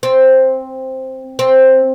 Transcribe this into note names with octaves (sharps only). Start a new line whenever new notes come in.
C4
C4